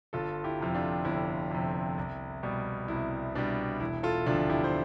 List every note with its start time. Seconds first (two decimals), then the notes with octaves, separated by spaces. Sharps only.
0.13 G1 F4 A4
0.44 E4 G4
0.60 F2 C3
0.75 D4 F4
1.05 G1 E4
1.51 F2 C3
1.98 C2
2.43 B2 G3
2.88 C2 E4
3.35 B2 G3 D4
3.80 E1 E4
4.03 F4 A4
4.26 D2 C3 F3 D4 F4
4.49 E4 G4
4.64 C5